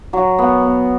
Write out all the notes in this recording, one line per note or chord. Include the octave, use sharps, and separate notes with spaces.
F#3
B3
B3